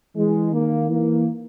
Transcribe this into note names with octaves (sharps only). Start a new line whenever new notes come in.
E3 G#3
D#3 A#3
E3 A#3